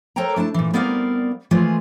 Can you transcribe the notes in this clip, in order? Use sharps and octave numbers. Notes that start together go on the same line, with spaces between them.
A4 A#4 C5 C#5 G5 A#5
A3 D4 E4 A5
A#2 E3
G3 B3 C4 A#4 D5 F5
E3 F3 G#3 A3 F4 G#4